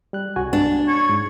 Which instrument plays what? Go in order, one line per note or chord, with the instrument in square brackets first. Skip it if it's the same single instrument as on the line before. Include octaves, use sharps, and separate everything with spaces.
[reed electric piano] G3 F#6
C2 F#4 G#5
[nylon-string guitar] D4
[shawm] C#5
[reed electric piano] G#2